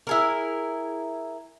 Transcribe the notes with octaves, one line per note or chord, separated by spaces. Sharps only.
E4 G#4 A#4